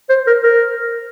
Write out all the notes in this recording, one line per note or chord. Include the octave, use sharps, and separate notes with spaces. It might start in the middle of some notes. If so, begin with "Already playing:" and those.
C5
A#4
A#4